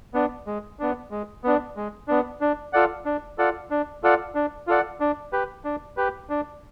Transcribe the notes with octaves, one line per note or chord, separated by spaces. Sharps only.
B3 D4
G#3
B3 D4
G#3
B3 D4
G#3
B3 D4
D4
F4 A4 D5 F#5
D4
F4 A4 D5 F#5
D4
F4 A4 D5 F#5
D4
F4 A4 D5 F#5
D4
G4 B4
D4
G4 B4
D4